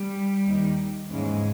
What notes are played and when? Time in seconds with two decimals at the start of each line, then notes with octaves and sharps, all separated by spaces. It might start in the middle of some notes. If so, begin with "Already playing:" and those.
Already playing: G3
0.45 D#2 D#3
1.08 D#2 G#2 C#3 E3 G#3